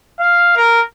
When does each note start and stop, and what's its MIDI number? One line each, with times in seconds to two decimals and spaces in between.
0.20 0.52 77
0.57 0.81 70